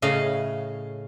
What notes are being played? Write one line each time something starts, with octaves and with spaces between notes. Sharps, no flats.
A2 C#3 D#5 F5